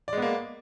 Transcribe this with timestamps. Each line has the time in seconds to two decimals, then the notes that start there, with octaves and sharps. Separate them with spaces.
0.08 D5
0.13 G#3
0.17 B3
0.22 A#3